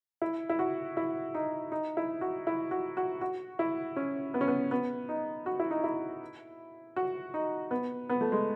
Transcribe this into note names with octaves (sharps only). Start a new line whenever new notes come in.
E4
E4
F#4
E4
D#4
D#4
E4
F#4
E4
F#4
F#4
F#4
E4
C#4
B3
C#4
B3
B3
D#4
F#4
E4
D#4
E4
F#4
D#4
B3
B3
A3
G#3